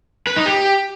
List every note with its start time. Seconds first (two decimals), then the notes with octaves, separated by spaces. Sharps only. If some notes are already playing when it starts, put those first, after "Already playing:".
0.27 B4
0.36 D#4
0.46 G4